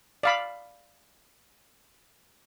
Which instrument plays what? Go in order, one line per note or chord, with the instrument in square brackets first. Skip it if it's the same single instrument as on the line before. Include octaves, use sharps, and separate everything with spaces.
[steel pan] D5 F5 B5